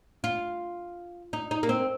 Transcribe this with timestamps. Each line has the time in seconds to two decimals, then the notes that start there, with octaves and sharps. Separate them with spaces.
0.24 F4
1.33 D#4
1.51 D#4
1.63 A#3
1.69 C4